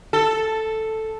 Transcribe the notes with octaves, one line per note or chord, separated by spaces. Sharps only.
A4